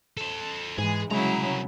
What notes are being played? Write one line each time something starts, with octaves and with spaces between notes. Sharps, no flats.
A4 C5
G#2 E3 G#3 G#4
C2 C#3 F#3 G#3 E4 A#5